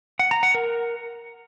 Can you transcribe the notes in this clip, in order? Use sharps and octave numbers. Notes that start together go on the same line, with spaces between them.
F#5
A#5
F#5
A#4